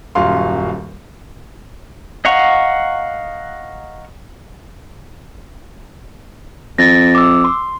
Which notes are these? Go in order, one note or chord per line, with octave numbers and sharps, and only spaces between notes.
D#1 F#2 F5 C6
D#5 F5 F#5 A#5 C#6
F2 A6 A#6
D6 E6
C6